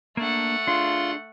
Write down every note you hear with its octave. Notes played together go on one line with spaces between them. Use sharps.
A3 A#3 D4 F#5
D4 F4 G#4 D5 C6